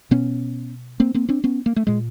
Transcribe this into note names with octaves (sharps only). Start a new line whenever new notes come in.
B2 B3 C#4
A#3 C4
A#3 C4
C4 D4
B3 C#4
A#3
A3
A#2 G#3